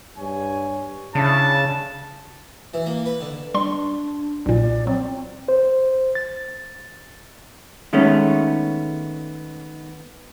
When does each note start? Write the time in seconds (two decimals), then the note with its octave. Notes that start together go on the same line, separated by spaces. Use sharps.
0.18 G2 C#5 G#5
1.15 C#3 D4 E4 A5
2.74 E3
2.86 A#3
3.05 B4
3.21 D3
3.54 G3 D4 C6
4.46 B1 A#2 D5
4.87 F#3 C4
5.48 C5
6.15 A6
7.93 D#3 G#3 A3 B3 C#4